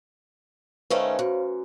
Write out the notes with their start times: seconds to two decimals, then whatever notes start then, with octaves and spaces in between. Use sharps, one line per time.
0.90 D#3 A3 C#4 B4 C5 F5
1.19 F#2